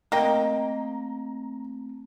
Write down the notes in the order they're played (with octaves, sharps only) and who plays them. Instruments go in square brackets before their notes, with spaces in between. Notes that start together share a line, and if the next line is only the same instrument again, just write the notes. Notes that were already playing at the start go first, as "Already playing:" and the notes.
[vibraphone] A3 C4 [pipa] A#3 D#5 G5 [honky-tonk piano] A#5